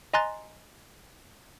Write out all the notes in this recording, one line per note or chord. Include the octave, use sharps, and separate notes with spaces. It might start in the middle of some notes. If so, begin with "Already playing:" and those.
D#5 G#5 A#5 C6 F#6 A6